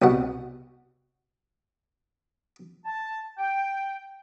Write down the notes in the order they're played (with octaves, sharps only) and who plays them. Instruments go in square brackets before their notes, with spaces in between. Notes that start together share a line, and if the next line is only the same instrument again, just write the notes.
[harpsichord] C2 B2 F#5
[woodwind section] A5
G5